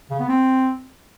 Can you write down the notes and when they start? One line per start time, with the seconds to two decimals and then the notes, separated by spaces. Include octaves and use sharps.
0.10 C#3
0.19 B3
0.29 C4